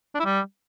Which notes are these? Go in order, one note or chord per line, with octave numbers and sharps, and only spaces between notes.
D4
E4
G3